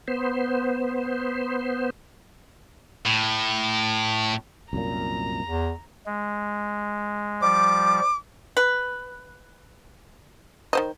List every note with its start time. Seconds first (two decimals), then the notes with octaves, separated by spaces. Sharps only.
0.08 B3 C5
3.06 A2
4.73 C2 F#2 A#2 A#5
5.47 E2
6.06 G#3
7.42 F3 G3 D6
8.57 B4
10.73 D#3 C5 D#5